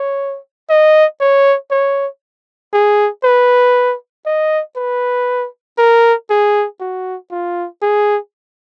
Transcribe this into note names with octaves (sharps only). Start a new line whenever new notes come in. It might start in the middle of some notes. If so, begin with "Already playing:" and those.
Already playing: C#5
D#5
C#5
C#5
G#4
B4
D#5
B4
A#4
G#4
F#4
F4
G#4